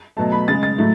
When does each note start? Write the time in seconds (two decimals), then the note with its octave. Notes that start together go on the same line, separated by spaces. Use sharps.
0.17 B2 F#3 A3 A5
0.32 B5
0.48 C#3 G#3 A6
0.63 A6
0.78 A2 F#3 A3